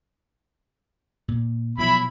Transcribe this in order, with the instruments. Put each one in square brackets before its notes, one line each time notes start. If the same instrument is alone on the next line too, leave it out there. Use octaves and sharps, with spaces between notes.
[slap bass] A#2
[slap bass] B2 F3 F#3 [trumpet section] E4 B5